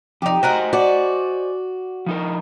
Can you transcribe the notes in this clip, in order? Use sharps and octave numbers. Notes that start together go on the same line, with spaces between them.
F2 D#4 G4
F#4 A#4 C5 D#5 F#5 G#5
F#4 D5
F3 D#4 A#4